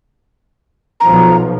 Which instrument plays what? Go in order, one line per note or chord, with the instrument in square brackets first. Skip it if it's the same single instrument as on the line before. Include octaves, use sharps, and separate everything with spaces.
[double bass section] B1 F3 [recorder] A#5